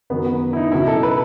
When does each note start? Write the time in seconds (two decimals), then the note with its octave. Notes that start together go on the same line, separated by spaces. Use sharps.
0.10 F#2 D#3 F#3 B3
0.26 B3
0.53 E4
0.57 D#4
0.72 C#2 B2 F#3 E4
0.88 A4
1.03 B4